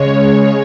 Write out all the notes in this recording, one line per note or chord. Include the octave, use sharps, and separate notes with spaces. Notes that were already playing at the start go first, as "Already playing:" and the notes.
Already playing: C#3 G#3 C#5